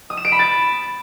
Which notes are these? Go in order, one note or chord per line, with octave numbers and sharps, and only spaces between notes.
D#6
E7
D7
B5
A6